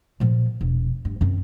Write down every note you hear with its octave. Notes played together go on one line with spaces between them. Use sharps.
A#2 F3
E1
G2
F#2 C4